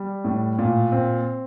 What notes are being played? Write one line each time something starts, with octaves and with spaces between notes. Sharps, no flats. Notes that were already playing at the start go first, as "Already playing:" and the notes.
Already playing: G3
A2
A#2
C4